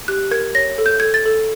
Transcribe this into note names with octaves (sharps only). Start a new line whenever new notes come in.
G4 F#6
A#4 G#6
C#5 A#6
A4
G6
A4 G#6
A6
A4